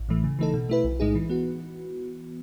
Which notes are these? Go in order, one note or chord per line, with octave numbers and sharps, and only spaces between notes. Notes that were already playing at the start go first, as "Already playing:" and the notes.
Already playing: A1
A2 E3 A3
C#3
E3 A3 D#4 A4
B2
A3 E4 B4
B1
A2 G#3 D#4 G#4
E3
B3 F#4